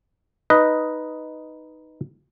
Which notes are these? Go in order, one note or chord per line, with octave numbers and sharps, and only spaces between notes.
D#4 B4 D#5